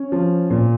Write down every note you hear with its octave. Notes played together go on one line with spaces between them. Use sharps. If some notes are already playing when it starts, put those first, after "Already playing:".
Already playing: C#4
F3
A#2